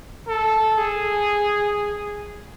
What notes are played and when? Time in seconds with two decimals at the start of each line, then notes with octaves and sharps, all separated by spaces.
0.28 A4
0.78 G#4